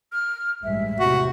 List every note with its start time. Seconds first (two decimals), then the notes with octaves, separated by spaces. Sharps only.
0.12 F6
0.64 A1 G2 G#3 E5
1.00 E2 C3 F#4